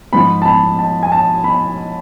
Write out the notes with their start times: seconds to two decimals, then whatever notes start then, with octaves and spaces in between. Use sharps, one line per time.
0.13 G#2 F3 B5
0.42 A5
0.45 B5
0.79 A5
1.03 G#5
1.12 A5
1.44 B5